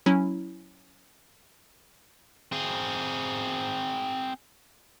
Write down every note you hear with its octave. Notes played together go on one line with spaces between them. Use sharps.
F#3 C#4 E4
C4 G#4